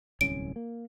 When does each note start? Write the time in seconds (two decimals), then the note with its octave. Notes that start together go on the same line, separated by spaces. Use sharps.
0.21 D1 C2 C#4 D7
0.56 A#3